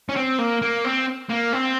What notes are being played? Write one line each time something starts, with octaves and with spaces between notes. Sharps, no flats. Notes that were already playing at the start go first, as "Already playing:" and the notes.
C#4
C4
A#3
A#3
C4
A#3
C4